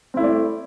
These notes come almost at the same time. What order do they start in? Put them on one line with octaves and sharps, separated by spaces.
C4 E4 A3 D5